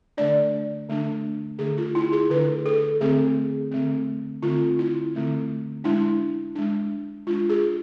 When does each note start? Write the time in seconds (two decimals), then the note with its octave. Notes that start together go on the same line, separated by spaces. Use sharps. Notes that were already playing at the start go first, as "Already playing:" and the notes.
0.17 D3 A3 D4 D5
0.89 D3 A3 D4
1.59 D3 A3 D4 G#4
1.78 F4
1.95 E4
2.12 G#4
2.30 D3 A3 D4 B4
2.66 A4
3.01 D3 A3 C4 G#4
3.71 D3 A3 C4
4.43 D3 A3 C4 F4
4.79 E4
5.14 D3 A3 C4
5.84 G#3 D4 E4
6.55 G#3 D4
7.27 G#3 D4 F4
7.50 G#4